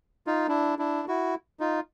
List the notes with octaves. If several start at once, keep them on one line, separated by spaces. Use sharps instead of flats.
D#4 F4
D4 E4
D4 E4
E4 F#4
D#4 F4